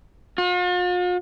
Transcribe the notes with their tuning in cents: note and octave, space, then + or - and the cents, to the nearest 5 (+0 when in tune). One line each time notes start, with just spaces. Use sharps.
F4 +45